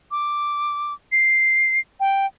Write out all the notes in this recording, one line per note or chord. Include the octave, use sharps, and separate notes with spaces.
D6
C7
G5